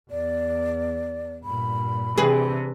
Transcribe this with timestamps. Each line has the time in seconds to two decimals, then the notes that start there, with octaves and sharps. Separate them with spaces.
0.11 E2 D5
1.44 G2 A#2 B5
2.18 C3 E3 D4 G#4 B4